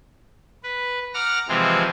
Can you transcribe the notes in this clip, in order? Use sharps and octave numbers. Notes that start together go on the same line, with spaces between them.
B4
F#5 A#5 D6 F6
C3 E3 F3 G#3 C4